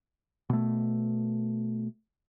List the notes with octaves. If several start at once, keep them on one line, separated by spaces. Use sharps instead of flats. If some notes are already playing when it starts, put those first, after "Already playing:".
B2 A3